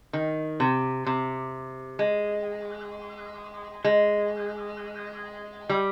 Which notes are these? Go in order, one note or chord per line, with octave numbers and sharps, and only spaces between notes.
D#3
C3
C3
G#3
G#3
G3